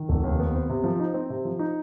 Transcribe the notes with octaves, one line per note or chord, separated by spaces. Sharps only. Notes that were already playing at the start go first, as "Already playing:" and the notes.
Already playing: D#3
F1
D#2
B3
C4
C3
F3
D#4
C4
C3
F3
D#4